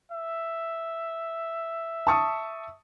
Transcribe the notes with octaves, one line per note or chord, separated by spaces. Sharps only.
E5
A5 C#6 D#6